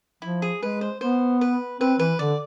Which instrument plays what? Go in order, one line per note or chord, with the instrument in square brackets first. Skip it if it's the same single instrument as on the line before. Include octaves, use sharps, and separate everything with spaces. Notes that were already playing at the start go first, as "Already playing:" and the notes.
[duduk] F3 [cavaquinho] E4
[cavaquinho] G#4
[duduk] G#3 [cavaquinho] B4
[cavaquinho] C5
[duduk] B3 [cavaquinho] C5
[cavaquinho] B4
[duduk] C4 [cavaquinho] B4
[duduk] E3 [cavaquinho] B4
[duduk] D3 [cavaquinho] D5